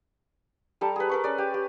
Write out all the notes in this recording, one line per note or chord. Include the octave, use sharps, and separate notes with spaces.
G3 A4 A#5
G#4 B4
A#4 B4 C#6
C#4 B4 D5
G4
G4